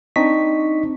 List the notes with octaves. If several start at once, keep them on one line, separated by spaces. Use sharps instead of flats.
C4 D4 D#4 D#5 C#6 B6